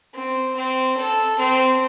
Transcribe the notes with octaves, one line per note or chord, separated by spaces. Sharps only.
C4
C4
A4
C4